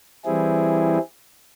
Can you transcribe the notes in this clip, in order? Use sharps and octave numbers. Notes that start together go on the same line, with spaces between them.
E3 G3 C4 E4 G#4